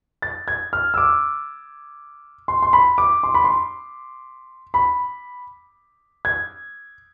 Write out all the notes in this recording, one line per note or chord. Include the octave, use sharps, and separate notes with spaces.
A6
G#6
F6
E6
D6
C6
C6
B5
D6
C6
B5
C6
B5
G#6